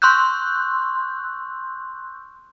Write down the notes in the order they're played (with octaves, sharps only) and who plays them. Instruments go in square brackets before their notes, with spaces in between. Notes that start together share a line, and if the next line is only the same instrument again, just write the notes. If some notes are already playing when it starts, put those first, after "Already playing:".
[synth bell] C6 C#6 E6 F#6 G6